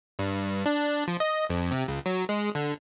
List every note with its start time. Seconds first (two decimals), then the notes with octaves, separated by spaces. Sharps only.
0.19 G2
0.66 D4
1.08 F3
1.20 D#5
1.50 F2
1.71 C3
1.88 C#2
2.06 F#3
2.29 G#3
2.55 D3